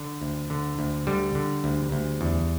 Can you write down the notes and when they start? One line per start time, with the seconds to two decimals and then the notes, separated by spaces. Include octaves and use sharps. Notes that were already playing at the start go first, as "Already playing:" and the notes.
Already playing: D3
0.22 D2
0.50 D3
0.79 D2
1.07 D3 G3
1.35 D3
1.64 D2
1.92 D2
2.21 E2